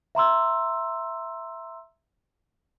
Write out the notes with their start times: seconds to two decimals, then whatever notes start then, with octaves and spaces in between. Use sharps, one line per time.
0.15 E5 A#5 C6 E6